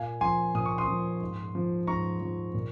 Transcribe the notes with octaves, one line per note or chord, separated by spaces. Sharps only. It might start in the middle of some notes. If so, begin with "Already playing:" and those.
Already playing: A#2 F5 G#5
F3 G#5 C6
A#2 D#6
C#6
C6 D#6
F3
G#2
F3
G#2 A#5 C#6
F3
A#2